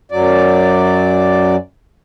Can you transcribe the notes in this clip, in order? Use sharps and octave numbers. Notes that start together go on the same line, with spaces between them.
F#2 F#3 D5